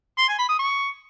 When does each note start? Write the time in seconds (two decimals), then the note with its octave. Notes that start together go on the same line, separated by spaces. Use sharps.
0.18 C6
0.28 G#5
0.38 B5
0.49 D#6
0.59 C#6